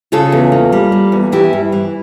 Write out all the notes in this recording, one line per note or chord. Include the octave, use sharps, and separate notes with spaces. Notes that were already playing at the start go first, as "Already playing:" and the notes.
C#3 F4 A4
E2
A#3
G3
A#3
E2
E3 E4 G4
G2
E3